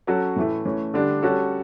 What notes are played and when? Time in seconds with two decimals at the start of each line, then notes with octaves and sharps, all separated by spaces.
0.07 F#3 C#4 F#4 A4
0.36 A2 E3 A3
0.65 E3 A3 C#4
0.94 D3 G3 D4
1.23 G3 C#4 F#4 A4